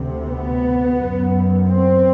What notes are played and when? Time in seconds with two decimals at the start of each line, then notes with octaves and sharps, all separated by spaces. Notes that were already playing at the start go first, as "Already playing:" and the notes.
Already playing: D2 C3
0.25 B3
0.97 F#2
1.68 C4